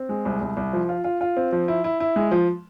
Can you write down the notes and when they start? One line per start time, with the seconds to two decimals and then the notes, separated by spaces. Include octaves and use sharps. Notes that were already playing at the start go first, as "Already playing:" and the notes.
Already playing: C4
0.09 G#3
0.25 C2
0.41 C2
0.57 C2
0.73 F3
0.89 F4
1.04 F4
1.21 F4
1.37 C4
1.52 F3
1.68 E4
1.84 E4
2.00 E4
2.16 G#3
2.31 F3